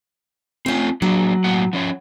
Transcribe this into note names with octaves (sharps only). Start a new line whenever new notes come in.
A3 C4 C#4 F4 G#5
F#3 A#3 D4 G#4
A2 A#3 F#5
F3 C#4 C#5